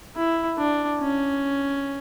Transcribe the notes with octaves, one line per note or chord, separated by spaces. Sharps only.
E4
D4
C#4